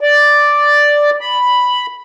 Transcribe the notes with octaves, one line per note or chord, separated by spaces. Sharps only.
D5
B5